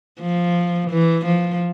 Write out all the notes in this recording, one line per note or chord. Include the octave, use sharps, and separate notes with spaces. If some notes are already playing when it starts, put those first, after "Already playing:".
F3
E3
F3